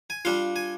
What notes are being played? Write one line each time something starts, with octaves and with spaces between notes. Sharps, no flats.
G#5
G3 D4 F4 F5
G#5